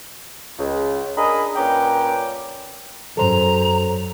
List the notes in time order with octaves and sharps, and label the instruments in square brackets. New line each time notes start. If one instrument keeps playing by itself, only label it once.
[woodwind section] C#2
D4 G#4 A#4 D#5 A#5 B5
A#2 C#4 B4 G5 A#5 D6
[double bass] F#2 [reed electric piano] A4 C5 [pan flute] A#5